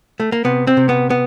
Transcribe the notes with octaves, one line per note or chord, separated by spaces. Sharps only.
A3
A#3
C3 B3
C4
C3
B3
B3